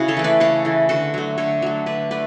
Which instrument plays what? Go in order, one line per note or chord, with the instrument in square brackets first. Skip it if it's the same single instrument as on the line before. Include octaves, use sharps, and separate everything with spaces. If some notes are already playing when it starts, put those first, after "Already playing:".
Already playing: [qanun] C#3 E4 F#4
A4 C#5
E3 A3
B4 D5
C#3 A4 C#5
E3 A3
D3 F#4 A4
F#3 A3
D3 A4 C#5
F#3 A3
D3 B4 D5
A3 B4 D5